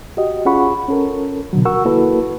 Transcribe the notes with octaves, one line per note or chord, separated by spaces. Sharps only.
F#4 G4 D#5
C#4 F4 G#4 F#5 B5 C#6
C#4 A4 A#4
B2 D3 F#3
F#4 A#4 F#5 C#6 E6
A#3 E4 F#4 A4 B4